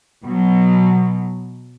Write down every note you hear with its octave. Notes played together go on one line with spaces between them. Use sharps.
B2 F#3